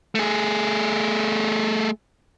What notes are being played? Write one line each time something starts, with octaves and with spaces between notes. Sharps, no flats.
A3 G#4